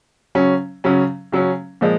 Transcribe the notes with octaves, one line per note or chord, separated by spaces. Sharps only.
C#3 F#3 C#4
C#3 F#3 C#4
C#3 F#3 C#4
A#2 F3 G#3